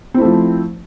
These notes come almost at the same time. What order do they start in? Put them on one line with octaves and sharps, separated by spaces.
C4 E4 A3 F3